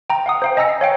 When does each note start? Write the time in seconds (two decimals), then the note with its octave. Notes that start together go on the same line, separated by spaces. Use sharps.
0.10 G5 A#5
0.26 F5 F#5 D#6
0.42 C5 F5 G5
0.57 D#5 G#5 A#5 E6 A#6 C#7
0.69 C7
0.81 C#5 F5 G5 C#7